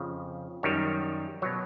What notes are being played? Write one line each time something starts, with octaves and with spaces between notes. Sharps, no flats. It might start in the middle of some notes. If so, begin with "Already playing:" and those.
Already playing: F2 C#3 F3
F#2 D#3 G3 C#5
B2 F#3 C#5